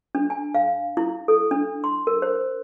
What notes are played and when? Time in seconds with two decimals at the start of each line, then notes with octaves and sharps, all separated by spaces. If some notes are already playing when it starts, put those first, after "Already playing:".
0.15 D4
0.30 G#5
0.55 F5
0.97 E4
1.28 A4
1.51 D4
1.84 C6
2.07 A#4
2.22 C5